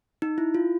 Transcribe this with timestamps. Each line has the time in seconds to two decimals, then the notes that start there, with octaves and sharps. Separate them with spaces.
0.22 D#4
0.38 E4
0.55 F4